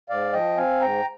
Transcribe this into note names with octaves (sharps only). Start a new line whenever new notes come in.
G#2 D5 F5
F3 D#5 G5
C4 F5 G#5
G#2 G5 A#5